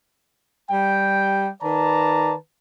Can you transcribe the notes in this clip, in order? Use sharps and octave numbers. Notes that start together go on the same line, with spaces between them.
G3 G5
D#3 B4 D5 A5 A#5